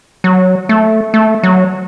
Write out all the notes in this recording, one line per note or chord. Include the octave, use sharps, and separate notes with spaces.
F#3
A3
A3
F#3